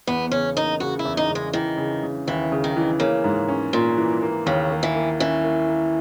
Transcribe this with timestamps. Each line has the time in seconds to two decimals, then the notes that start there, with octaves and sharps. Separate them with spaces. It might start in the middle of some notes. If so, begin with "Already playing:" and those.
0.07 E2 B3
0.31 C#3 C#4
0.56 A#3 D#4
0.80 C#3 F#4
0.99 E4
1.05 E2
1.17 D#4
1.30 C#3
1.35 G#3
1.53 D#3 E3
1.78 C#3
2.03 C#3
2.27 D#2 E3
2.52 C#3
2.64 D#3
2.76 E3
3.00 C#3 A#3
3.24 G#2
3.49 C#4
3.73 A#2 A#3
3.97 E3
4.22 A#3
4.46 D#2 C#3
4.72 A#3
4.83 E3
4.95 A#3
5.19 E3 C#4
5.44 A#3
5.69 A#3